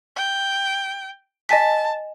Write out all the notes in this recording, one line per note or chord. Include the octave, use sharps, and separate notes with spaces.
G5
D#5 G#5 A5 B6